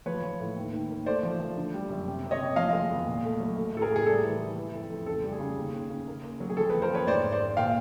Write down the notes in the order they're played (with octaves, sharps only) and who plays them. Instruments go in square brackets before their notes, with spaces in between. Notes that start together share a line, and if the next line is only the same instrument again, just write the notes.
[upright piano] F3 B4 C#5
F3
A2
D#2
D#3
A#3
A3 C5 D5
F3
F3
D3
G3
F#2
C3
C3
C#5 D#5
C3
F3 D#5 F5
G#3
E2
A#2
A3
F#3
A3
A2 A4
G#4 A#4
A2
G#4
G3 A4
E3
E3
E3
F2
F2
C#3 A4
G3
G#4
C#3
D#2
D#2
C#3
A#3
A#3
F#3
G#4
F2 A4
F3 A4 B4
A#4 C5
F2 B4 C#5
G#2 C5 D5
G#2
C5 D5
A#3
A#2 F5 G5